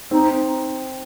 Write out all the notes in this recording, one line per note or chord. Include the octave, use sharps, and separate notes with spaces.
C4 D#4